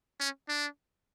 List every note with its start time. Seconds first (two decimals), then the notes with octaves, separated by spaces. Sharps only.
0.20 C#4
0.49 D4